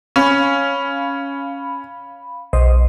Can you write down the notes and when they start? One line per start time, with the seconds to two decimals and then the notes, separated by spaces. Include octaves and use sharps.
0.16 C#4 F5 B5
2.53 B1 C5 D#5